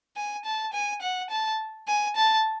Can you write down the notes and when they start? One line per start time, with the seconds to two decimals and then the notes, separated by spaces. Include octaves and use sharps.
0.16 G#5
0.45 A5
0.73 G#5
1.02 F#5
1.30 A5
1.88 G#5
2.16 A5